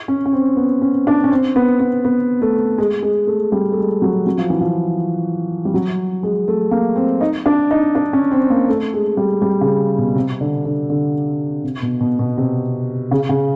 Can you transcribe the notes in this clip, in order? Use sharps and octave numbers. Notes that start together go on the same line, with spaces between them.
C#4
C#4
C4
B3
C#4
D4
C#4
C4
B3
B3
B3
A3
G#3
G#3
A3
G3
A3
G#3
F#3
F#3
F3
E3
F3
G3
F#3
G#3
A3
A#3
C4
D#4
D4
D#4
D4
C#4
C4
A#3
A3
G#3
G3
G3
C#3
B2
C3
D3
D3
D3
C3
B2
B2
B2
C3
C#3
C#3